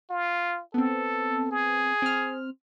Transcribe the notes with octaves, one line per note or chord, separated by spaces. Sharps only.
F4
B3 C4 A4
G#4
C4 F6